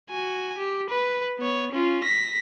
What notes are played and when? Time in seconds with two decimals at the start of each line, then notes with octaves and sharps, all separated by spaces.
0.10 F#4 G#5
0.58 G4
0.89 B4
1.39 B3 C#5
1.71 C#4 F4
2.04 A#6 B6